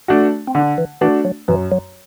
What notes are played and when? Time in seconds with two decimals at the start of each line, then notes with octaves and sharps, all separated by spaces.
0.08 A3 D4 F#4
0.48 C4
0.55 D3 D4
0.78 E3
1.01 E3 A3 D4 F#4
1.25 F#3
1.48 F#2 E3
1.72 F#3